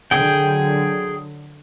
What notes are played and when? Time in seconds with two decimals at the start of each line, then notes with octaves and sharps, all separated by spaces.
0.11 D3 F#3 G#4 G5